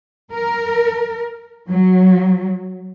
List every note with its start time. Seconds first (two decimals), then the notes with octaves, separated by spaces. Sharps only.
0.33 A#4
1.69 F#3